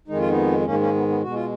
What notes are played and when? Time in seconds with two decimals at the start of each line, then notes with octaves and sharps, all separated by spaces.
0.08 F2 D#3 G#3 D#4
0.19 F4
0.28 B3 D#4
0.65 G#2 D#3 G#3 A#3 C#4
0.80 A#3 C#4
0.94 B3
1.09 B3
1.23 B2 G#3 F#4
1.34 F4